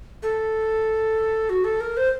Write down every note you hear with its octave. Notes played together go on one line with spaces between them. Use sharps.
A4
F#4
A4
A#4
C5